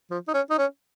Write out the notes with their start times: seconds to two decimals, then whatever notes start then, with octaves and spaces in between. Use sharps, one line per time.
0.11 F3
0.28 D#4
0.34 C#4
0.50 D#4
0.59 C#4